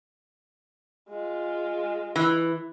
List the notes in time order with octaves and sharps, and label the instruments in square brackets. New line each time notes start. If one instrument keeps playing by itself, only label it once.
[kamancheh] G#3 F4
[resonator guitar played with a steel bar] E3